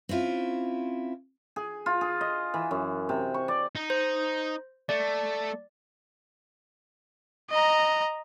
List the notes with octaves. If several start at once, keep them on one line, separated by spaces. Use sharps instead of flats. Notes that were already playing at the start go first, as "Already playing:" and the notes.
C4 C#4 E4 F4
G#4
F4
G#4
D#5
E3
F#2
C3
C#6
D5
D#4
C5
A3 D5
D#5 A#5